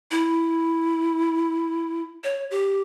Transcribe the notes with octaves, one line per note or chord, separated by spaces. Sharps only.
E4
C#5
G4